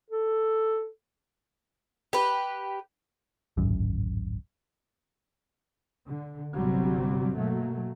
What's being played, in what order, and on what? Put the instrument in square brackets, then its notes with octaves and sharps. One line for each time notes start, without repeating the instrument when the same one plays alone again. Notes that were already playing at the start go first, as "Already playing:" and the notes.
[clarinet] A4
[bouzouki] G4 B4
[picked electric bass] D1 G#1 F#2
[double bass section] D3
G1 C3 F#3 G3 C4
B2 F#3 A3 A#3